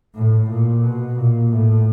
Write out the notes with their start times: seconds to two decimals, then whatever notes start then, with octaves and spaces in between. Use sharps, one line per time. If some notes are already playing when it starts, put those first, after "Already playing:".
0.16 A2
0.51 A#2
0.84 B2
1.18 A#2
1.52 A2